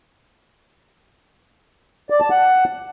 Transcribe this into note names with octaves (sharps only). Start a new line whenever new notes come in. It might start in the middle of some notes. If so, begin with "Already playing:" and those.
D5
A5
F#5